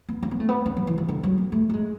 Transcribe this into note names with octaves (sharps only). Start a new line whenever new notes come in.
B3
C#4
B3
A3
B3
C#4
F#3
E3
E3
D3
F#3
B3
A3
A3
G#3